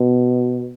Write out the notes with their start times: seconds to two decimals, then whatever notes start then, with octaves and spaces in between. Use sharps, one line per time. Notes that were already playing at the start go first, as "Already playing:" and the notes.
Already playing: B2